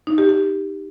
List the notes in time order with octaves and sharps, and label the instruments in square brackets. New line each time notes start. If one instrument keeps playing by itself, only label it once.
[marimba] D#4
G4
G4